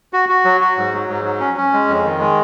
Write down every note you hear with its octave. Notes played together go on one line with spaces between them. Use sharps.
F#4
F#4
F#3
F#4
G#2
F#3
G#2
F#3
C#4
C#4
G#3
F2
D#3
G#3